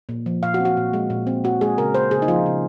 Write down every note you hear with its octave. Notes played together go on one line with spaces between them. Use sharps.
A#2
F3
A#2 F5
F#4
C4
F#4
A#2
G#3
A#2
C4
A#2 F#4
G#3 G#4
C#3 A#4
A#3 C5
C#3 G#4
D#4
F3 F4
C#3